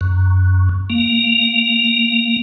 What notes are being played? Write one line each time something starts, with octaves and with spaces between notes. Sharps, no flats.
F#2
A#3